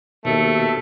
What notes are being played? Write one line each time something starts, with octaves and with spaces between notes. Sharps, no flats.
D#2 B2 A3 A4